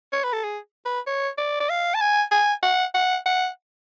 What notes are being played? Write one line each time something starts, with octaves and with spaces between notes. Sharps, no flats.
C#5
B4
A4
G#4
B4
C#5
D5
D5
F5
A5
G#5
G#5
F#5
F#5
F#5